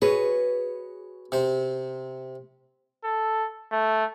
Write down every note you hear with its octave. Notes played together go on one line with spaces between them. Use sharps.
F#4 G#4 B4 C#5
C3 C5
A4
A3